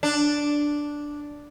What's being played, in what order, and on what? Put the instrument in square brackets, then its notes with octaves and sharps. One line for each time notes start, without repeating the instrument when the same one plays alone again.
[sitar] D4